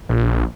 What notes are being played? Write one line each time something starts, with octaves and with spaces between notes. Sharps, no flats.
A#1